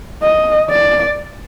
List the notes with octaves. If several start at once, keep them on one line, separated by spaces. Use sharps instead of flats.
D#5
D5